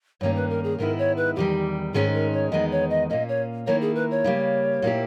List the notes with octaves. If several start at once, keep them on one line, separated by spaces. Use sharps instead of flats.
G2 D#3 A#3 C#4 C#5
B4
A#4
G#4
G#2 D#3 G#3 B3 E4 A#4
C#5
B4
E2 D#3 G3 G4
G#2 D#3 G#3 C#4 G#4
A#4
C#5
E2 D#3 G#3 B3 D#5
C#5
D#5
A#2 A#3 C#4 D#5
C#5
D#3 A#3 E4 C#5
G#4
B4
C#5
C#3 G3 A#3
A#2 A#3 E4 G4